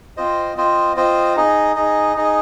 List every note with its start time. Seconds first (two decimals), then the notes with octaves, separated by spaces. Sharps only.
0.17 C4 F4 C5 D#5
0.57 C4 F4 C5 D#5
0.96 C4 F4 C5 D#5
1.36 D#4 G#4 D#5
1.76 D#4 G#4 D#5
2.16 D#4 G#4 D#5